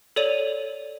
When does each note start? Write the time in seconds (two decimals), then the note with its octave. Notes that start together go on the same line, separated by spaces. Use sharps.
0.16 A4 C#5 D5 D#7 F7 F#7